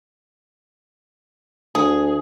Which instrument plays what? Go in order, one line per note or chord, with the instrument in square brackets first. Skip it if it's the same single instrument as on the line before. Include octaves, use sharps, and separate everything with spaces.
[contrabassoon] D2 [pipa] G#4